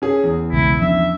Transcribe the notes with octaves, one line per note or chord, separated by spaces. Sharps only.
C#4 G#4
E2
B1 C#3 G#3 E4
F3 C#4 D4 E5